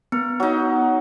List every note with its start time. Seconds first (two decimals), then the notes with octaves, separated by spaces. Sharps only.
0.12 B3 A#4
0.40 F#3 D#4